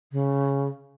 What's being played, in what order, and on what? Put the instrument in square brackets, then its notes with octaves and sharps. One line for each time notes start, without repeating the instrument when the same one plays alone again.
[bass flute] C#3